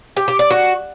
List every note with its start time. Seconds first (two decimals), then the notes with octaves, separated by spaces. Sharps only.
0.17 G4
0.28 G4
0.39 D5
0.50 F#4